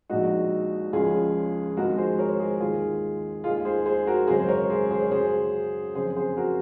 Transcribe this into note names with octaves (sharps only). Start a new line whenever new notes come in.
A#1 A#2 G#3 D#4 F#4
C#2 C#3 F3 G#3 F4 G#4
G#1 G#2 F3 G#3 F#4 A#4
G#4 C5
A#4 C#5
G#4 C5
D#2 D#3 G#3 F4 G#4
D#2 D#3 G#3 F4 G#4
G#4 C5
G#4 C5
F#4 A#4
G#1 F#2 C#3 G#3 G#4 C5
C5
A#4 C#5
G#4 C5
G#4 C5
C#5
F#2 C#3 F#3 G#4 C5
F#1 F2 C#3 G#4 C5
G#4 C5
F#4 A#4